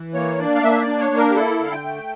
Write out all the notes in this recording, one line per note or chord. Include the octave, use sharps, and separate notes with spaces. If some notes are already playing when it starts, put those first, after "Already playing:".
Already playing: E3
A#3 C#5
D4 D5
F5
A#3 E5
D5
D4
C#5
A#3
A#4
G4
E4 A4
D3 F5
G5
A3